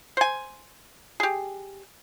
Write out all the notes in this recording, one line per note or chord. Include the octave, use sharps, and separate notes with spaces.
C5 G#5
G4 G#4